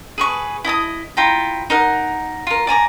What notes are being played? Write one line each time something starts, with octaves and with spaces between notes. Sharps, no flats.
G#4 B4 C#6
E4 D#5 A5 D#6
E4 F4 G5 A#5
D#4 A#4 F#5
F4 A#4
D5 G#5 A#5 D6